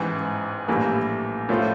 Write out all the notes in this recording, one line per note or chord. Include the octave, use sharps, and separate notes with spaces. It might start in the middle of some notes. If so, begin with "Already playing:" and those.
Already playing: A1 G#2 E3
A#1 A2 E3 G3 A#3
A2 F3 A3 C#4 F4